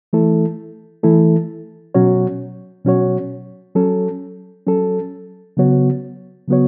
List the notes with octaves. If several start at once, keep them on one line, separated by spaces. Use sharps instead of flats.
E3 A3 E4 A4
E3 A3 E4 A4
B2 F#3 C#4 F#4 C#5
B2 F#3 C#4 F#4 C#5
F#3 C#4 A4
F#3 C#4 A4
C#3 F#3 B3 F#4 C#5
C#3 F#3 B3 F#4 C#5